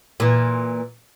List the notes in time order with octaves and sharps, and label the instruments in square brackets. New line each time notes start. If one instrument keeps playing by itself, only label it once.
[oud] A#2 E3